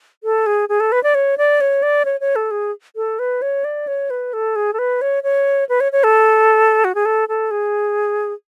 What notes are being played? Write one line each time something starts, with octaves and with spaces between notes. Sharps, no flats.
A4
G#4
G#4
A4
B4
D5
C#5
D5
C#5
D5
C#5
C#5
A4
G#4
A4
B4
C#5
D5
C#5
B4
A4
G#4
A4
B4
C#5
C#5
B4
C#5
C#5
A4
F#4
G#4
A4
A4
G#4